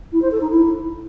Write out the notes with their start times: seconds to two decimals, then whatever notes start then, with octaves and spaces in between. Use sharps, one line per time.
0.12 E4
0.22 C5
0.31 A4
0.41 D#4
0.50 E4